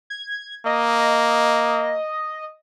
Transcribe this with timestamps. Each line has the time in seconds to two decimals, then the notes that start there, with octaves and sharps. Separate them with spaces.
0.10 G#6
0.66 A#3 D#5